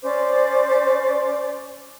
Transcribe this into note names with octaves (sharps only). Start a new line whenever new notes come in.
C#4 C5 D5 D6